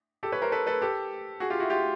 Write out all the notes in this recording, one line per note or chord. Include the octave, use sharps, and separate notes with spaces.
G4 A4
B4 C#5
A#4 C5
A4 B4
A4 B4
G4 A4
F#4 G#4
F4 G4
E4 F#4
F4 G4